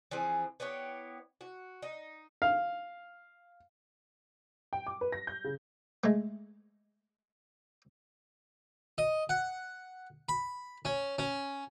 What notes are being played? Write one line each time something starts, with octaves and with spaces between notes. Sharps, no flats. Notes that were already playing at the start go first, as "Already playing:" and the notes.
E3 F3 C4 G#4
B3 E4 G4 C#5
F#4
D#4
F5
G5
D6
B4
A#6
G6
C#3
G#3 A3
D#5
F#5
B5
C#4
C#4